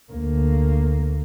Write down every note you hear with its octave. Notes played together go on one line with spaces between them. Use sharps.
D2 A#3